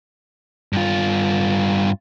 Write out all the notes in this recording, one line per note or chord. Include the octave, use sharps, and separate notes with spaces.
G2 F4